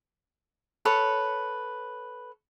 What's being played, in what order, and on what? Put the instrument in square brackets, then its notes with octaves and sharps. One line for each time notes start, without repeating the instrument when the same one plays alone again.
[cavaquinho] A4 B4 C#5